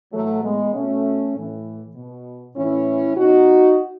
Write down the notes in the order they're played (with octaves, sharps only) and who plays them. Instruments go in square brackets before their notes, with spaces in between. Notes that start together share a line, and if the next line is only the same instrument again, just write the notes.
[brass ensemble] A2 E3 F#3 A3
G#3 B3
B2 A3 C#4
A2 E3
B2
A2 E3 C#4 E4
B2 D#4 F#4